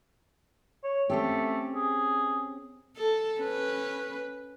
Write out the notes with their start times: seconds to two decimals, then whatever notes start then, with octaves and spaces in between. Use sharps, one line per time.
0.83 C#5
1.10 A3 C4 C#4 G4
1.75 G#4
2.97 A4
3.40 C#4 B4